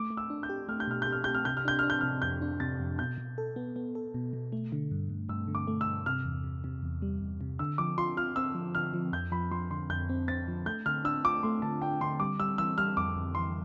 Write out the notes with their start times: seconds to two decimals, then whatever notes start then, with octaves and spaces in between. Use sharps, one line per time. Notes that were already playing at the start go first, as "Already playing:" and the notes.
Already playing: A3 D6
0.10 A3
0.17 E6
0.30 D4
0.43 G6
0.49 G4
0.69 A3 F6
0.80 G6
0.87 B2 F6
1.02 G4 G6
1.12 F6
1.24 G4 G6
1.34 F6
1.45 C3 G6
1.57 F6
1.65 D4 G6
1.79 D4 F6
1.90 G6
2.01 C3 F6
2.22 F2 G6
2.42 D4
2.60 C3 A6
2.80 F2
2.98 B2 G6
3.18 B2
3.38 A4
3.56 B3
3.76 B3
3.95 A4
4.14 B2
4.33 B2
4.52 A3
4.72 D3
4.91 G2
5.10 G2
5.29 G2 E6
5.48 D3
5.55 D6
5.68 A3
5.81 E6
5.87 G2
6.06 C3 F6
6.25 E2
6.44 C3
6.64 C3
6.82 E2
7.02 G3
7.21 E2
7.41 C3
7.59 D3 E6
7.78 F3 D6
7.98 F4 C6
8.17 F4 F6
8.36 C4 E6
8.55 F3
8.75 D3 F6
8.94 F3
9.13 F2 G6
9.32 F3 B5
9.51 F3 C6
9.71 D3 C6
9.90 F2 G6
10.09 C4
10.28 C4 A6
10.48 F3
10.66 A3 G6
10.86 D3 F6
11.04 D4 E6
11.24 F4 D6
11.43 A3 C6
11.62 D3 A5
11.82 D4 G5
12.01 D3 C6
12.20 G3 D6
12.40 G3 E6
12.58 E3 E6
12.78 G3 F6
12.97 F2 D6
13.16 F2
13.35 E3 C6